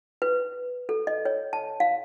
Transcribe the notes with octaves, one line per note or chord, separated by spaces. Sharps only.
B4
A4
D#5
C#5
A5
F5